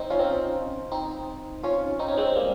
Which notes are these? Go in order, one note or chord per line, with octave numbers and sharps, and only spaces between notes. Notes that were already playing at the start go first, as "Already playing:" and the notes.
Already playing: C4 D#4
C#4 F4
C4 D#4
C4 D#4
C#4 F4
C4 D#4
C#4
G#3 C4
G3 A#3